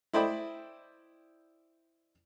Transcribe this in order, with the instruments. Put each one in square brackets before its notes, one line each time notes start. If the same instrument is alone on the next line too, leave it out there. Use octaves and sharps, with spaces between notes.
[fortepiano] E4 C5 D5 D#5 G5 B5